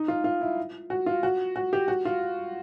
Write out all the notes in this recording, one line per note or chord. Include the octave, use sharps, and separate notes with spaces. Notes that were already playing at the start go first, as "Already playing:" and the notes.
Already playing: D#4
F4
F4
E4
F#4
F4
F#4
F#4
G4
F#4
F4